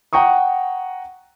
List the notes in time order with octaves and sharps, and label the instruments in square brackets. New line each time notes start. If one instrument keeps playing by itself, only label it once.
[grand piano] F#5 G5 A#5 C#6 D#6